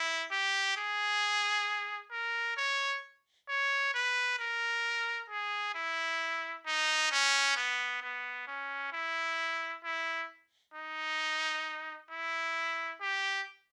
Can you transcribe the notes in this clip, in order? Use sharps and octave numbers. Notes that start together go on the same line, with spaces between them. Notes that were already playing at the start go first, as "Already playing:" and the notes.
Already playing: E4
G4
G#4
A#4
C#5
C#5
B4
A#4
G#4
E4
D#4
C#4
B3
B3
C#4
E4
E4
D#4
E4
G4